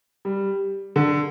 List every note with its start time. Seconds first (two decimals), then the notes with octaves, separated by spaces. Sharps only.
0.25 G3
0.96 D3